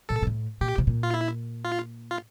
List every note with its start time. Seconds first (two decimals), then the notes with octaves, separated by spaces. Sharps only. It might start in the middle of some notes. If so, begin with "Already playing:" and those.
0.09 A#2 A4
0.22 A#2
0.27 A2
0.61 A#2 G4
0.78 C3
0.87 A#2
1.03 F4
1.14 E4
1.65 F4
2.11 F4